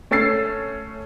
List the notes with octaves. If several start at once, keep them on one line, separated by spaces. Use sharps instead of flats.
A3 C#4 E6 A6 C7